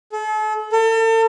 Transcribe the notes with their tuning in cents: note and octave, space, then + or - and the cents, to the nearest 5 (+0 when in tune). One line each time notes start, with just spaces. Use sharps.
A4 -40
A4 +40